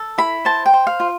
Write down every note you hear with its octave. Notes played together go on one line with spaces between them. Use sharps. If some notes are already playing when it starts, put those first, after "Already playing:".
Already playing: A4
E4 B5
C5 A5
G5
C5
F5
F4